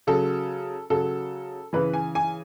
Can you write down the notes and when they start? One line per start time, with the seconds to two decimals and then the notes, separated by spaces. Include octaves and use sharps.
0.07 C#3 F#3 A4
0.90 C#3 F#3 A4
1.73 C#3 E3 B4
1.93 G#5
2.15 G#5